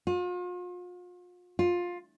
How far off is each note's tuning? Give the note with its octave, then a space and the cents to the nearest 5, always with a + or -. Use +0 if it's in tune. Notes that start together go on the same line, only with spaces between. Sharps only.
F4 +40
F4 +15